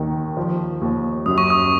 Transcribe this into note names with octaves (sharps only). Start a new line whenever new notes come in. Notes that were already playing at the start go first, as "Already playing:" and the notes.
Already playing: D#2 D#3
F3
D#2
F#2 D#6
C#6
D#6